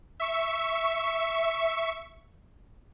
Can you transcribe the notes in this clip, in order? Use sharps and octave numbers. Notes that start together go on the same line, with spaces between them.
E5 C#6